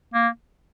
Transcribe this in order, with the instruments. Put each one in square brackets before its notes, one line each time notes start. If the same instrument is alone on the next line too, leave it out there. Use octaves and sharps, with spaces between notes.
[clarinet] A#3